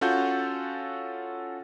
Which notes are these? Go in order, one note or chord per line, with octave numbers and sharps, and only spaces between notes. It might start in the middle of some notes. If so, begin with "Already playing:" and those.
C#4 F4 F#4 A4 F#5 G6